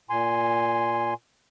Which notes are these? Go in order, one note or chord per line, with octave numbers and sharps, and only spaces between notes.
A#2 G#5 C6